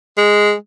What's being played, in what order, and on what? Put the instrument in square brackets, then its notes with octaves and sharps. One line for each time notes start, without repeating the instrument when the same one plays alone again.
[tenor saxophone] G#3